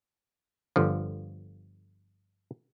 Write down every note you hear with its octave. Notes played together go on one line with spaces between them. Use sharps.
G1 D3 F3